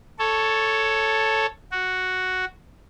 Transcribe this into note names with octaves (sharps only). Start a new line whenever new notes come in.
A4 C#5
F#4